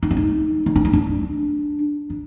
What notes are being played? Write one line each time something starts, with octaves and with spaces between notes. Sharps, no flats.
D#4
D4
D#4
D#4
D4
D#4
D4
D4